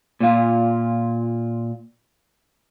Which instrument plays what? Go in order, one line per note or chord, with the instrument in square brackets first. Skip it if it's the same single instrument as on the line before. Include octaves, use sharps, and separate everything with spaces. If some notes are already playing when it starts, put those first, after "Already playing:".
[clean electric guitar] A#2 F4